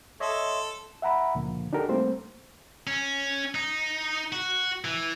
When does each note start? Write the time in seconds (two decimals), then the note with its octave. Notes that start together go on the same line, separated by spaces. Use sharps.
0.20 A4 C#5 D#5 E5 C6
1.02 E5 F#5 A#5 B5
1.35 C#2 A#2 D3 F3 A#3
1.73 D4 D#4 F#4 G4 A4 A#4
1.89 G3 A3 A#3 C4 C5
2.87 C#4
3.55 D#4
4.33 F#4
4.85 E3